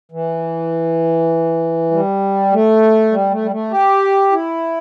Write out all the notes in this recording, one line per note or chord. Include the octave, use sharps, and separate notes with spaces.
E3
G3
A3
G3
A3
G3
A3
G4
E4